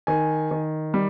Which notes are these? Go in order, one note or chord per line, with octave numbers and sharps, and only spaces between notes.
D#3 G#5
D#3
G3